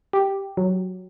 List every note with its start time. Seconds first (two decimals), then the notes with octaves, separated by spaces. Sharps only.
0.13 G4
0.57 F#3